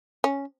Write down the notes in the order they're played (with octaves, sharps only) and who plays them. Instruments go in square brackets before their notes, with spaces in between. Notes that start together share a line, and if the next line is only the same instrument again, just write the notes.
[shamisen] C#4